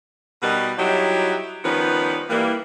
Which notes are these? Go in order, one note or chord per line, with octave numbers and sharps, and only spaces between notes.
B2 G3 D#4 F#4 A#4 B4
F#3 G3 D#4 E4 F#4 G4
D#3 F3 G3 B3 C#4 B4
E3 G3 A#3